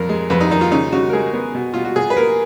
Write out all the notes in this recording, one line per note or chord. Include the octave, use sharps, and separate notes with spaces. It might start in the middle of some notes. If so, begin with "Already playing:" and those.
Already playing: F2 A#2 A#4
G#3
F2 B4
D#4
D#3 D#4
F4
C#3 D#4
C#3 F#4
A#4
G#3 G#4
B3
B2
B2 F4
F#4
B2 G#4
B4
A#3 A#4